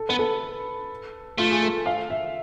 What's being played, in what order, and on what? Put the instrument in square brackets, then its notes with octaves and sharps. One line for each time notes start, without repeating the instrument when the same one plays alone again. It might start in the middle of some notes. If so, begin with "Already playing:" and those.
Already playing: [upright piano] A4
[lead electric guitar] B3 [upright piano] B4
[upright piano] A4
[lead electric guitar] A3 [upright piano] F4
[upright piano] G#4
A4
F5
E5